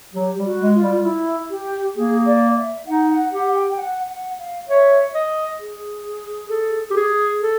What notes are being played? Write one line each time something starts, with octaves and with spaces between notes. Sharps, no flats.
F#3 G4
G3
F#4
G#3
F4
G3
F4
E4
G4
A#3 G#4
D5
E5
D#4 F#5
F#5
G4 F#5
G5
G5
F#5
F#5
F5
C#5 E5
D#5
G#4
A4
G4
G#4
A4